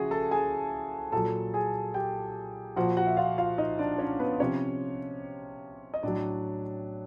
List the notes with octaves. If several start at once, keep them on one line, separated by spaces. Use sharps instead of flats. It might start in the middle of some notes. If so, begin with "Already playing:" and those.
Already playing: C#3 F3 E4 F#4 G#4 F#5 G#5
A4 A5
G#4 G#5
A#2 F#3 A4 A5
G#4 G#5
G4 G5
A#2 F3 F#4 F#5
F#4 F#5
E5
F4 F5
F4 F5
D#4 D#5
D4 D5
C#4 C#5
B3 B4
C3 F3 C#4 C#5
D#5
A2 F#3 D4 D5